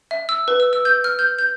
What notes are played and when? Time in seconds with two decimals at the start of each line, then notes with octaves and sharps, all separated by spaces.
0.11 E5
0.29 E6
0.48 B4
0.60 E6
0.73 E6
0.85 G6
1.04 F6
1.19 G6
1.39 G6